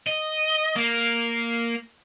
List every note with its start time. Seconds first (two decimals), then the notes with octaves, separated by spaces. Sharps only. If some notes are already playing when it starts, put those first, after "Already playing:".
0.06 D#5
0.76 A#3